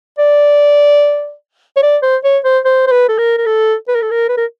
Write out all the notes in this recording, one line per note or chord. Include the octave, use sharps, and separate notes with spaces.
D5
C#5
D5
C5
C#5
C5
C5
C5
B4
A4
A#4
A#4
A4
B4
A#4
A4
A#4
B4
A#4